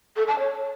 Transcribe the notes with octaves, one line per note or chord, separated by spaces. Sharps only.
A4
A5
C#5